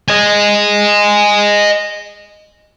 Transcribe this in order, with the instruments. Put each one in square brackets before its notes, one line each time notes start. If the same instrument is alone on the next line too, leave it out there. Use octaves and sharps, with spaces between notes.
[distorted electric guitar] D#5 G#5